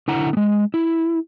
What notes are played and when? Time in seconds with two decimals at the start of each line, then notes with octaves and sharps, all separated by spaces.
0.08 D3 E4 F#5 A#5
0.33 G#3 B3
0.74 E4